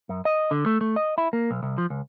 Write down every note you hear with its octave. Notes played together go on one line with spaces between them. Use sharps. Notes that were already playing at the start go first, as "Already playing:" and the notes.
F#2
D#5
D3
A3
A3
D#5
E4
A#3
B1
C2
F3
C#2